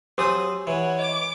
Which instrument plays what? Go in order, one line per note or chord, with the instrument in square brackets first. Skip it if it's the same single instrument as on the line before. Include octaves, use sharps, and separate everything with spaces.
[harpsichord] F#3 G#4 [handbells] G4 E6 [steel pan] C5 D#6
[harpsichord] E3 [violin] C#5 F#5
[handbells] D#5 [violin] D6